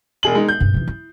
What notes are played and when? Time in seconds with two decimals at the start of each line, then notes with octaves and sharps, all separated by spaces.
0.23 E1 G#4 F#7
0.35 G#3 D#4
0.48 G6
0.60 G2 C3
0.74 C3 E3
0.87 E4